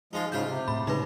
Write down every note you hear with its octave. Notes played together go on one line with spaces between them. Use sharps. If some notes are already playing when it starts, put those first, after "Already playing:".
F3 G#3 D#4 F4
G#2 C#3 E4 F4 G6
C3
A2 B5
C#3 G#3 D#4 B4